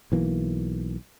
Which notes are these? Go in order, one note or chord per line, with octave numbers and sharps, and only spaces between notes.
B1 E3 A#3